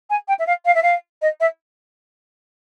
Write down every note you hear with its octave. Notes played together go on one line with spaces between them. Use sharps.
G#5
G5
E5
F5
F5
E5
F5
D#5
E5